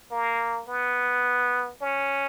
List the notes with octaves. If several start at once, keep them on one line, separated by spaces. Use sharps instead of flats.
A#3
B3
C#4